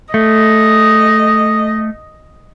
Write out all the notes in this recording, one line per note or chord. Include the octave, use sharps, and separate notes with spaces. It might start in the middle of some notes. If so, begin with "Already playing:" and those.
A3 D#5